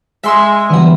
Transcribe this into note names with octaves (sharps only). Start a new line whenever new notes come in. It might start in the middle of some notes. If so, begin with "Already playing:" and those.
G#3 E5 C6 E6
D3 E3 F#3 G3 B3